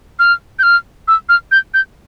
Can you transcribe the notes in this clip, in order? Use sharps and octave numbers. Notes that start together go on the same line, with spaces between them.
F6
G6
F6
E6
F6
G6
G6